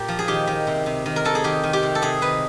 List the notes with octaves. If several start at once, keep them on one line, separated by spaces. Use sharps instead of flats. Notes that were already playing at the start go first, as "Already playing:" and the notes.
Already playing: A#2 G4
F3
G#4
D#3 G4
D#3
C3
C3
D#3
A#4
D#3 A4
G#4
D#3 G4
D#3
G4
C3
A4
C3 G#4
D#3 B4